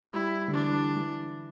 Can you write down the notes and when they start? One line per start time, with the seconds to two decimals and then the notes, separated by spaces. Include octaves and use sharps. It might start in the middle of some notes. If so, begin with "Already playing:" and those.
0.13 G3 E4
0.48 D3
0.53 E3 D4
0.68 E3
0.95 E3